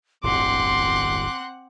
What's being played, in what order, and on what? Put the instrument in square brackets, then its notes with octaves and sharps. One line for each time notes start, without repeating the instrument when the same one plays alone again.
[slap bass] D1 G1 E2 [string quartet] C4 F#5 F#6 [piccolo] C6 [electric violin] D6